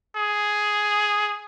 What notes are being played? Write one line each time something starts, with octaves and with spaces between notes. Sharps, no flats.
G#4